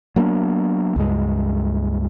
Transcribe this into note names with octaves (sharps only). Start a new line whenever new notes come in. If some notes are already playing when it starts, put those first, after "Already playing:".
F#3 A#3 B3 D4
C#2 G2 G#3